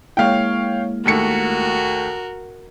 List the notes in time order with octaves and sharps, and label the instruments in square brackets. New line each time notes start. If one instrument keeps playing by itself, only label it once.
[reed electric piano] G#3 A#3 E4 [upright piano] C#5 F5 G5
[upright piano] D#2 A3 C#7 [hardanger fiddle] F#4 A#4